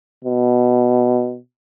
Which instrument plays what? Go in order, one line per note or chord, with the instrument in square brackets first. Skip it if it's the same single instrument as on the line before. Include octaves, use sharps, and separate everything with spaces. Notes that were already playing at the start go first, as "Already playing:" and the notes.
[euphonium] B2